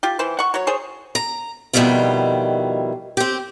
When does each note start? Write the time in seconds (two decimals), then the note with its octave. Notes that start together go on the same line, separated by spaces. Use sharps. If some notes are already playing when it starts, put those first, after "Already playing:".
0.03 F4 G4
0.19 E3 C5
0.39 F#5 C#6
0.54 F#3 C#5
0.67 G#4 C5 C#5
1.15 A#5
1.73 F2 B2 D#3 G3 E4 F4
3.17 C4 G4